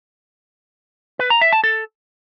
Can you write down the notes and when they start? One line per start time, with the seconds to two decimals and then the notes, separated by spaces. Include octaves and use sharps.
1.19 B4
1.30 A#5
1.41 E5
1.53 A5
1.64 A4